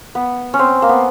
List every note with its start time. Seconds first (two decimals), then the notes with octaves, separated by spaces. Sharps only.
0.15 B3
0.54 C#4
0.59 C4
0.82 A#3
0.89 B3